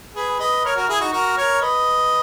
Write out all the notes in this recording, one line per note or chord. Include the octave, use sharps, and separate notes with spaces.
G#4 B4
B4 D#5
A#4 C#5
F#4 A#4
E4 G#4
D#4 F#4
F#4 A#4
A#4 C#5
B4 D#5